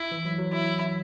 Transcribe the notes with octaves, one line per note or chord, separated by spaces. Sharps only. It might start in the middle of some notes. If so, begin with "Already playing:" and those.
Already playing: E4
E3
F#3
F#3
E4